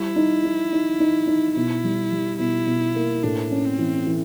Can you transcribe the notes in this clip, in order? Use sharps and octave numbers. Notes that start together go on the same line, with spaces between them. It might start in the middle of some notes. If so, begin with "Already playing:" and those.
Already playing: G3 E4
D#4
D#4
D#4
D#4
D#4
B2 E4
G3
G3
B2 E4
B2
A#3
A2 D4
C#4
C4
E3
E3